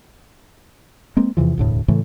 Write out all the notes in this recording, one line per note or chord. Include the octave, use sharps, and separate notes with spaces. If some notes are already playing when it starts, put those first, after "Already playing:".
G#3 A#3 C4
E2 C3 E3 F3
E1 D2 A2
A2 C#3 E3 A3